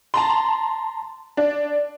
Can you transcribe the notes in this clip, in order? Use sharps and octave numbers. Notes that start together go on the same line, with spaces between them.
A5 A#5 C6
D4